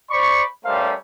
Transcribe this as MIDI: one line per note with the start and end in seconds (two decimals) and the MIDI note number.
0.10 0.43 72
0.10 0.43 74
0.10 0.43 83
0.10 0.43 85
0.65 0.94 55
0.65 0.94 57
0.65 0.94 61
0.65 0.94 70
0.65 0.94 72
0.65 0.94 77